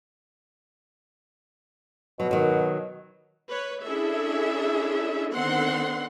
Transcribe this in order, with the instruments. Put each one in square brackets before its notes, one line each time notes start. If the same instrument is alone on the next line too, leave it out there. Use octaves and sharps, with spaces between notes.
[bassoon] B2 [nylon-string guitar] F#3
[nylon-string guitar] D#3 F#3
[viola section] B4 C#5
C#4 D4 E4 G#4 A4 E5
D3 D#3 B3 C4 F#5 C6